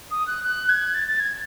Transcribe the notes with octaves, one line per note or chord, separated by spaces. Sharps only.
D#6
F#6
F#6
G#6
A6
A6
G#6